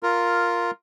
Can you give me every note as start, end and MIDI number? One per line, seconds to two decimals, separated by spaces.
0.03 0.71 65
0.03 0.71 70